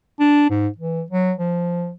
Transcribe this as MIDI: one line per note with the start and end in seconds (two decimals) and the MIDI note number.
0.20 0.47 62
0.50 0.68 44
0.78 1.02 52
1.10 1.32 54
1.38 1.92 53